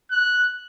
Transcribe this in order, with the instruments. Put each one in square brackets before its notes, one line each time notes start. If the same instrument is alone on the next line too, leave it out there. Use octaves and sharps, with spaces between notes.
[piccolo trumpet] F#6